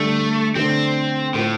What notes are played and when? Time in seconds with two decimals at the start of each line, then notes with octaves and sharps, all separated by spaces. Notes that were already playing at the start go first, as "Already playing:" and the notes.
Already playing: D3 G3 A3 D4
0.55 D3 A3 C4 D4
1.34 A2 A3 F4 A4 C5